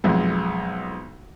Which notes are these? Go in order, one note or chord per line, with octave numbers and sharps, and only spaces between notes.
B1 F2 G#3